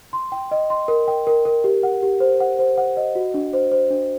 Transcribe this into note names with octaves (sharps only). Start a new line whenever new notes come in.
C6
G5
D#5
C6
A#4
G5
A#4
A#4
G4
F#5
G4
C5
F#5
C5
F#5
D#5
F#4
D4
C5
C5
D4